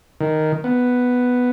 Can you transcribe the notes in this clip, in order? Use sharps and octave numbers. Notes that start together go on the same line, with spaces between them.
D#3
B3